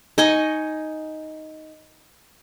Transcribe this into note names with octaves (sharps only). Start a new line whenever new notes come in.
D#4 D#5 G#5 C#6